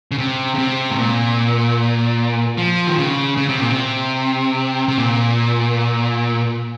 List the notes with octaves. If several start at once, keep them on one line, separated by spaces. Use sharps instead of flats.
C#3
C3
C#3
C3
G#2
A#2
F3
D#3
C#3
C#3
C3
A#2
C3
C3
A#2